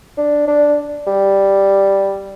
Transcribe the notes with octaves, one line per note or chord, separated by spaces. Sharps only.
D4
D4
G3